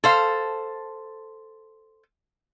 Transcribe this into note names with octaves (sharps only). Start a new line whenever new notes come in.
A4 C5 F5